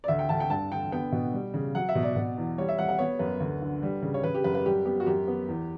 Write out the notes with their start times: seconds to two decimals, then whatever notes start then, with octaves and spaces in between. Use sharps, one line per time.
0.04 D5
0.08 D2 E5
0.19 G5
0.29 D2 A5
0.40 G5
0.50 G2 A5
0.72 D3 G5
0.92 B3 G5
1.12 B2
1.33 G3
1.54 C#3
1.75 F#3 F#5
1.89 E5
1.95 B2
2.03 D5
2.16 B2
2.38 E2
2.58 G3 C#5
2.69 E5
2.79 G3 F#5
2.89 F#5
2.99 B3 C#5
3.19 F#2 B4
3.40 D2
3.62 D3
3.83 G3
4.02 C#3
4.14 C#5
4.24 C#3 B4
4.34 G4
4.44 F#2 B4
4.55 B4
4.65 G3 G4
4.85 B3 G4
5.00 F#4
5.06 F#2 G4
5.28 B3
5.48 E2